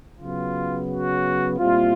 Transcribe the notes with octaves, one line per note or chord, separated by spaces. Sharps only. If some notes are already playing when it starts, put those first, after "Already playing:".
C#3 F#3 B3 F4
F#4
A#2 G3 C4 E4 F4